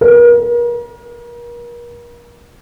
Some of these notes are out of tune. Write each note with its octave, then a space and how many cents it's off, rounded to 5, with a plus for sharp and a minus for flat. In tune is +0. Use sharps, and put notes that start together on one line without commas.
A#4 +40